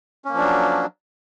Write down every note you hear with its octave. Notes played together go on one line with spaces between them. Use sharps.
F3 F#3 A#3 C#4 D4